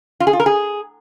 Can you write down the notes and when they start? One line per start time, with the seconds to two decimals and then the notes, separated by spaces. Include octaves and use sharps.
0.20 F4
0.27 G#4
0.33 F4
0.40 A#4
0.46 G#4